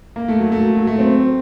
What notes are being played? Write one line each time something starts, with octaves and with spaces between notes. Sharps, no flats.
A#3
A3
F#3
A3
F#3
A3
C4